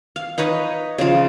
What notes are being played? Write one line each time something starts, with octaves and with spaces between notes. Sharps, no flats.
F5
D#4 B4 C#5 D#5
C#3 F3